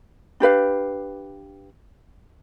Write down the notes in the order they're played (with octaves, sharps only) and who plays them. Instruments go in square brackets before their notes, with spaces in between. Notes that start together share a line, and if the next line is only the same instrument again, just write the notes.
[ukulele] D4 G4 B4 F5